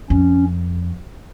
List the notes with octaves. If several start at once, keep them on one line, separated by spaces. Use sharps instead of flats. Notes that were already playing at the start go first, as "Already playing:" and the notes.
F2 C#4